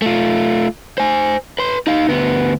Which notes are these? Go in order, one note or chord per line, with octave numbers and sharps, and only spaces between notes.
A3 F4
C5 G#5
B4 C6
D#4 F5
D2 B3